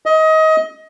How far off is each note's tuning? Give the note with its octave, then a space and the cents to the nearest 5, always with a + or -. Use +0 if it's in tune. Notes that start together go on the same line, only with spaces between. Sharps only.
D#5 +25